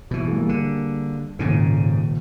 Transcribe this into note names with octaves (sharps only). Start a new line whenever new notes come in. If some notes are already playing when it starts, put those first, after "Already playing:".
B2 E3
G3 A#3 G#4
D3
D#1 C#2 G#2 C#3 D#7